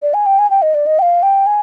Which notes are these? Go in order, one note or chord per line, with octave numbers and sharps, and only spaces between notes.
D5
G#5
G5
G#5
G5
D#5
D5
D#5
G5
F5
G5
G#5